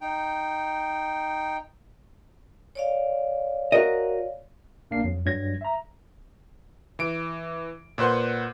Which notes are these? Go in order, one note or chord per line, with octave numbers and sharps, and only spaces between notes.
D#4 G5
C#5 D5 F5
F#4 A#4 D#5
B1 A#3 D4 F5 C7
F2 F#3
G2 F#3 G#6 A#6
E5 A#5
E3 D7
A#2 B4 C5 F#5 C6